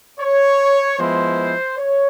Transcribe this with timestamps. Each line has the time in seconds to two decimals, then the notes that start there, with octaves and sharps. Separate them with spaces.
0.20 C#5
0.99 F3 G#3 B3 E4 C5
1.79 C#5